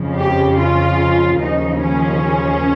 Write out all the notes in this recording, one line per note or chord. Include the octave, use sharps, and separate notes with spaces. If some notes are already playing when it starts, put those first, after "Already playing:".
Already playing: F2 C#3 F3
G4
F4
D#2 C#3 F3 D#4
C#4